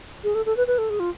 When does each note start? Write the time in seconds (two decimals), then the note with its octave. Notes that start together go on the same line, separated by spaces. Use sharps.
0.24 G#4
0.35 A4
0.46 A4
0.57 B4
0.67 B4
0.78 A4
0.90 G#4
1.00 F4